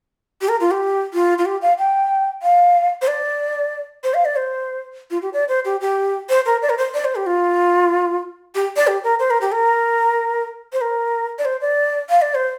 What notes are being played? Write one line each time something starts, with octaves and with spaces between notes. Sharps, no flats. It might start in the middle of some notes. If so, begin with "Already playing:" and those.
G4
A#4
F4
G4
F4
F4
G4
F5
G5
F5
C5
D5
C5
F5
D5
C5
F4
G4
D5
C5
G4
G4
C5
A#4
D5
A#4
C5
D5
C5
G4
F4
G4
D5
G4
A#4
C5
A#4
G4
A#4
C5
A#4
D5
C5
D5
F5
D5
C5